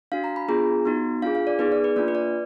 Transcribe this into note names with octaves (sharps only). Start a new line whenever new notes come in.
D4 F#4 F5
A#5
B5
B3 D4 F4 G#4 A#5
B3 D#4 F#4
D4 F4 G#4 F5
F5
D5
B3 D#4 G#4 B4
D5
B4
A#3 D4 F4 D5
B4
D5